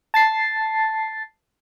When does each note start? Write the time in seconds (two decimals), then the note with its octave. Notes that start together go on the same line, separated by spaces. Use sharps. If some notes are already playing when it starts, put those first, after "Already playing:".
0.14 A5 A6 C7